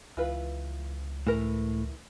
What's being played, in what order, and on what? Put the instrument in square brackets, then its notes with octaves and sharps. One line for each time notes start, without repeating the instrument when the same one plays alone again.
[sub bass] C#2 [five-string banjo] E3 F4 B4
[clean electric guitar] A2 [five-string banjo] E3 A#4